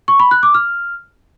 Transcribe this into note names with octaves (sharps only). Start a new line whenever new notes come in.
C#6
B5
F#6
D6
F6